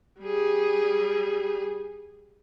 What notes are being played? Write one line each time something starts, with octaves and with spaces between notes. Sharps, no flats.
G3 G#4